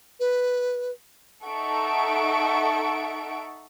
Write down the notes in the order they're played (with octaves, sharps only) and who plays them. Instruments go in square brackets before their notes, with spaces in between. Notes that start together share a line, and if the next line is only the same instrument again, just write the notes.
[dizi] B4
[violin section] D#4 A4 E5 F#5 C#6 D7